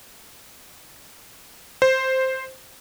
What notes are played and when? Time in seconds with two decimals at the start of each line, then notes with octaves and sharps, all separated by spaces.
1.82 C5